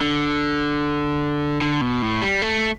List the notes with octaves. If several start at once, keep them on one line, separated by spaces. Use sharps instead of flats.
D3
D3
B2
A2
G3
A3